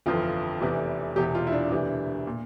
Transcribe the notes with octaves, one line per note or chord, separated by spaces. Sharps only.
G1 F2 E3 F4
F1 E2 C3 E3
E1 E2 C3 G4
F4
E4
D4
E1 D2 C3 E3
A#2